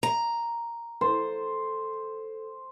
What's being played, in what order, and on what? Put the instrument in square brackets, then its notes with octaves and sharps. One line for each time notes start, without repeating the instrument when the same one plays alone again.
[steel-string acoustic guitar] A#5
[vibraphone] A4 [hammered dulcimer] C5